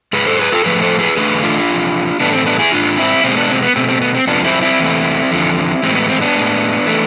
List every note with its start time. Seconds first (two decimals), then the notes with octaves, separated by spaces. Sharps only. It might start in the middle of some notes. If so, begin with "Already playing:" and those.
0.13 G#2 G#3 G#4 B4
0.26 A4 C5
0.39 G#4 B4
0.52 F4 A4
0.65 A2 F3 A3 G#4 B4
0.82 A4 C5
0.99 G#4 B4
1.17 E2 D3 A3 G#4 B4
1.42 D4 F4
1.68 E2 C3 F3
2.20 A2 E3 A3 B3 D4
2.33 C4
2.46 B3 D4
2.59 E4 G#4
2.72 G#2 G#3 D4 F4
2.97 C4 E4
3.24 B2 G#3 C4
3.37 B3 D4
3.50 C4
3.62 B3
3.76 B2 A3 C4
3.89 C4
4.01 B3
4.15 C4
4.27 F2 C3 F3 G#3 B3 D4
4.44 C4 E4
4.61 C4 E4
4.79 E2 C3 E3 A3
5.31 E2 D3 F3
5.83 A2 E3 G#3 C4
5.95 B3
6.09 C4
6.22 B3 D4
6.35 A2 G#3
6.86 E3 A3